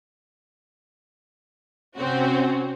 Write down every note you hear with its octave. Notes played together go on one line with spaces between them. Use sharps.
C3 C4 C#4 F#4